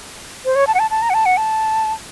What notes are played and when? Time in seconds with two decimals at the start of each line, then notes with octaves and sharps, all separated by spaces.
0.45 C5
0.55 C#5
0.67 A5
0.75 F#5
0.79 A5
0.91 A5
1.02 A#5
1.10 F#5
1.14 A5
1.26 F#5
1.37 A5